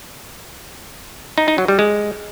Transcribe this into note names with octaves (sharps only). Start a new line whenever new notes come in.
D#4
D#4
F#3
G3
G#3